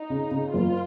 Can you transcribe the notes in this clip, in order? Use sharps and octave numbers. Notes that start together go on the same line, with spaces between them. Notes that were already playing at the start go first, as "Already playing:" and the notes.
Already playing: D#4
C#3
C#3
F#1 F4